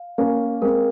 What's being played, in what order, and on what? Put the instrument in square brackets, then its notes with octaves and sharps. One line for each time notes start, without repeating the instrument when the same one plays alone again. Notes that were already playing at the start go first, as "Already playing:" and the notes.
Already playing: [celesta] F5
[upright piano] A#3 C#4 [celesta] F5
[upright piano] G#3 C4 [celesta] A#4